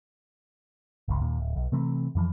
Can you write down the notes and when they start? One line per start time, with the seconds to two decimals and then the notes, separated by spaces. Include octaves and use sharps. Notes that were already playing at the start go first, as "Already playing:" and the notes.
1.08 G1 C#2
1.22 D#2 A#2
1.40 D1
1.56 B1
1.72 C3 E3 A3 C4
2.15 F2 E3 F3